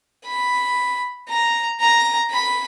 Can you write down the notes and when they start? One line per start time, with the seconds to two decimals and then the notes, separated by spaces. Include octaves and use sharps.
0.26 B5
1.29 A#5
1.81 A#5
2.31 B5